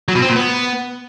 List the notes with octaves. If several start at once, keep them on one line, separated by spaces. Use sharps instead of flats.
F#3
B2
C4
A#2
B3